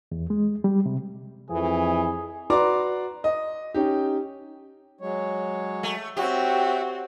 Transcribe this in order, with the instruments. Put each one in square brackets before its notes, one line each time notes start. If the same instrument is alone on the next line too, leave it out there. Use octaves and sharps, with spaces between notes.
[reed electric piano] E2
G#3
G3
C3
[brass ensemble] F2 [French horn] E3 [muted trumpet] G#4
[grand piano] F#4 B4 D5 A#5 C6 D6
D#5
C#4 D#4 G4
[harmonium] F#3 G#3 C#5
[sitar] A3
[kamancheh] C4 F#4 [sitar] G4 [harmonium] C#5 E5 G5